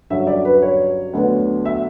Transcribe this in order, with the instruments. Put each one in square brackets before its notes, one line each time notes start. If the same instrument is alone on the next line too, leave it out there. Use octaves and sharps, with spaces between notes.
[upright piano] G2 D3 F#3 C#4 E5
D5
B4
C#5
D2 D3 F#3 B3 D4
E5